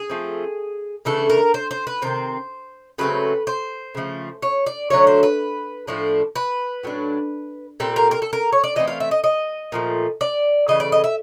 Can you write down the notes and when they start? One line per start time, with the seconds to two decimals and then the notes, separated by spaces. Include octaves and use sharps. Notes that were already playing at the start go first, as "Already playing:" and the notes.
Already playing: G#4
0.10 F3 A3 C4
1.05 C#3 E3 A3 D4 A4
1.30 A#4
1.54 C5
1.71 C5
1.87 B4
2.02 C3 D#3 C4 C5
2.98 C#3 F#3 A3 C4 B4
3.47 C5
3.95 C#3 F3 A3
4.42 C#5
4.66 D5
4.90 D3 F#3 A3 C#4 C#5
5.07 C5
5.23 B4
5.87 A2 F3 A3 D4
6.36 B4
6.83 A2 F#3 B3 D4
7.80 A#2 G3 C4 A4
7.96 A#4
8.11 A#4
8.22 A4
8.33 A#4
8.52 C#5
8.64 D5
8.76 E3 A3 C4 D#5
8.87 F5
9.00 E5
9.11 D#5
9.24 D#5
9.72 A#2 F3 A3
10.21 D5
10.68 C#3 E3 A3 D#5
10.80 D5
10.92 D#5
11.04 E5